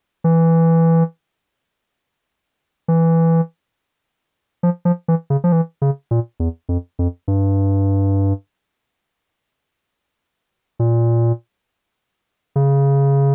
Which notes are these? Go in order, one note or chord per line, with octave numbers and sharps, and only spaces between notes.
E3
E3
F3
F3
E3
C#3
F3
E3
C#3
A#2
E2
F2
F2
G2
A#2
C#3